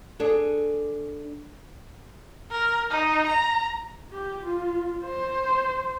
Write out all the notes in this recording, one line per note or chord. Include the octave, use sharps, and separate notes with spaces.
D4 G#4 A4
A#4
D#4
A#5
G4
F4
C5